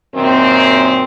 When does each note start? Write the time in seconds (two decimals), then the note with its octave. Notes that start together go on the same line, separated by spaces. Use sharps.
0.15 F#2 A#2 D#3 C4